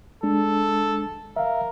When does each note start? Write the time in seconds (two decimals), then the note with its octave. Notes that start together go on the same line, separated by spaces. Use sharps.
0.23 G#3 D4 A4
1.36 A#4 E5 F5